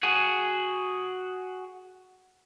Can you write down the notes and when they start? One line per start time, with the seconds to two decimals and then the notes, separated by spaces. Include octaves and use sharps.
0.03 F#4 G#4